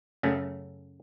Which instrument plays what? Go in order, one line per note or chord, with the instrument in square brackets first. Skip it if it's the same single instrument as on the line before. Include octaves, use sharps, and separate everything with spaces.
[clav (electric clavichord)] F#2 C#3 A3 C#4